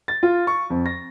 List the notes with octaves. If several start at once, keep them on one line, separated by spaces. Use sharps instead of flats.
A6
F4
C#6
F2
A#6